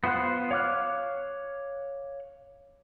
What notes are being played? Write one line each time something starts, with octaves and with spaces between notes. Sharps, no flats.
B3 F4 C5 F#5 F#6
C#5 F5 D6 F6 F#6